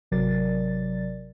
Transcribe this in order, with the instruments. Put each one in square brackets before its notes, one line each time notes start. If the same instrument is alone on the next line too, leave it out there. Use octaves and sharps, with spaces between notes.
[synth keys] G#1 C3 F#3 A#4 D5 A6